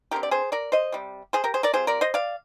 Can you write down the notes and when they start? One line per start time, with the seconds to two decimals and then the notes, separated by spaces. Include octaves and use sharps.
0.11 D3 G3 C4 G4 A#4
0.23 D5
0.31 G#4 C5
0.52 A#4 D5
0.72 C5 D#5
0.92 C3 G3
1.33 G#4 C5
1.44 G4 A#4
1.54 G#4 C5
1.63 A#4 D5
1.73 G3 C4 F4 G#4 C5
1.87 A#4 D5
2.01 C5 D#5
2.14 D5 F5